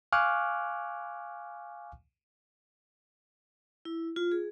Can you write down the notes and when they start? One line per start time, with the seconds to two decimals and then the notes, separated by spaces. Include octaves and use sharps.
0.12 F5 G#5 C#6 D6 F6 F#6
3.85 E4
4.16 F4
4.32 G#4